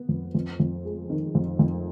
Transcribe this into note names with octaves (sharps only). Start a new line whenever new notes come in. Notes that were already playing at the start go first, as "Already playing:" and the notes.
Already playing: B3
F2
F2
F2
G#3
D#3
F2
F2